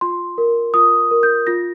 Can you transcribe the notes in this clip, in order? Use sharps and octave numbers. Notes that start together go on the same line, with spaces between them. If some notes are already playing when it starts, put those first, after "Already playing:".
F4 C6
A#4
F4 D#6
A#4
G6
F4 A#6